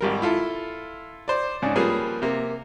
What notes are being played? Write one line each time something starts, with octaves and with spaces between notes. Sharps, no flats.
G#1 G3 A#4
E4 F4 A4
C5 D5
G#2 C#3 D4
F3 G3 A#3 C#4 G#4 B4
C3 A#3